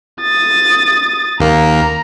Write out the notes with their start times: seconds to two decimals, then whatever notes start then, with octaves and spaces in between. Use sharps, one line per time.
0.22 D#6 A6
1.40 D#2 A#3 A#5